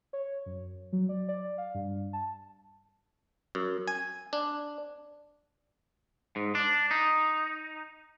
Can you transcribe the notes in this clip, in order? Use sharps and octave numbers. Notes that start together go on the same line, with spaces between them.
C#5
F#2
F#3
D5
D5
F5
G2
A5
F#2
G#5
D4
G#2
D4
D#4